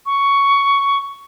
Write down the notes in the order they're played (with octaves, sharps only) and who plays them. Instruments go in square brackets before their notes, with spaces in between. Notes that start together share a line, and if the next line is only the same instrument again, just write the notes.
[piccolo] C#6